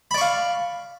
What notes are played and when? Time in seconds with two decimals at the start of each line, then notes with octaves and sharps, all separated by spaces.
0.11 B5
0.14 D5
0.18 C#6
0.21 F5